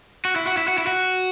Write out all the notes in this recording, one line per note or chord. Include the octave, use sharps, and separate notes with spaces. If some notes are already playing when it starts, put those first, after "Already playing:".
F#4
E4
F#4
E4
F#4
E4
F#4